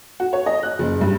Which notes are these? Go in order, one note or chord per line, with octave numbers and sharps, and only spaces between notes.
F#4
C#5
D#5
F#6
F#1
G2